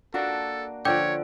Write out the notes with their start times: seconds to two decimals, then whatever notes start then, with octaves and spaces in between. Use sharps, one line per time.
0.14 A#3 D4 F#4 A4
0.85 D3 F3 C#5 D5 G5 D6 G6